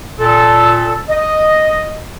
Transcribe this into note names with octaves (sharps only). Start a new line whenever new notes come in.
A#2 A4
D#5